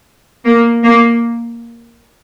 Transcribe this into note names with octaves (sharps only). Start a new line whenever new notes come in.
A#3
A#3